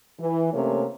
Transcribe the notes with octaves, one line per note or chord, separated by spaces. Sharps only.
E3
C3 A3 A#3 C#4 C#5